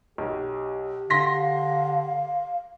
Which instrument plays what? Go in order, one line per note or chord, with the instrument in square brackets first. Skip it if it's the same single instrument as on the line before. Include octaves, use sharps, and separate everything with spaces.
[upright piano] B1 [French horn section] G4
[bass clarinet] D3 [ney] F5 [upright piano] C6 A#6 B6